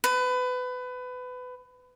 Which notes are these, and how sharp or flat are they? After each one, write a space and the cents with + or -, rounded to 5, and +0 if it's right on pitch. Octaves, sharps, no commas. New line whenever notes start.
B4 +25